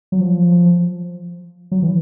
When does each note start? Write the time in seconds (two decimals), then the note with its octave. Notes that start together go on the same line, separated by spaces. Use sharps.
0.12 F#3
0.20 F3
1.72 F#3
1.82 E3